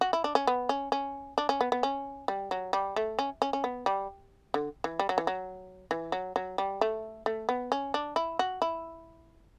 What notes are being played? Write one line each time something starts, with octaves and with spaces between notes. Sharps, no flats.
F#4
E4
D4
C#4
B3
C#4
C#4
D4
C#4
B3
B3
C#4
G3
F#3
G3
A3
C#4
C#4
C#4
B3
G3
D3
E3
G3
F#3
E3
F#3
E3
F#3
F#3
G3
A3
A3
B3
C#4
D4
E4
F#4
E4